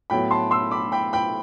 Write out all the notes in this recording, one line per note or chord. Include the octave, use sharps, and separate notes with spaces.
A2 F#3 B3 G5 B5
A5 C6
C6 E6
B5 D6
G5 B5
G5 B5